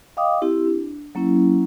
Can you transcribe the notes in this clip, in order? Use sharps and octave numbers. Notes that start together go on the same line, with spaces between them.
D#5 F5 G5 D6 D#6
C4 E4 G4
D4
F#3 A#3 C#4 E4